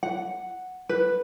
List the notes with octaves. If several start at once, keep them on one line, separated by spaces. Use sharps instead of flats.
F#5
B4